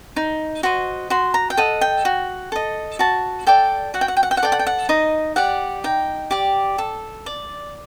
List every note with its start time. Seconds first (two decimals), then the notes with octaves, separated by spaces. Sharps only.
0.16 D#4
0.63 F#4 C5 D#5
1.10 F#4 C6
1.34 A#5
1.50 G5
1.57 A4 D#5 F#5
1.81 G5
2.05 F#4
2.52 A4 D#5
2.99 F#4 A5
3.47 A4 D5 G5
3.94 F#4 F#5
4.01 G5
4.08 F#5
4.17 G5
4.23 F#5
4.31 G5
4.37 F#5
4.42 A4 D5 G5
4.52 F#5
4.59 G5
4.67 F#5
4.89 D#4 D#5
5.36 G4 D5 F#5
5.84 D#4 G5
6.31 G4 D5
6.78 A4
7.26 D5